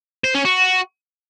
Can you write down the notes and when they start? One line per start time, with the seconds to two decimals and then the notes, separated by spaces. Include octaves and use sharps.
0.24 C5
0.35 C#4
0.45 F#4